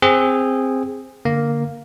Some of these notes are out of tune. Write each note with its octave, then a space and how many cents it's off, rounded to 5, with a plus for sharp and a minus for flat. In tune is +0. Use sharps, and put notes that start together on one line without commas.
C4 +0 G#4 -15
D3 -20 A#3 +0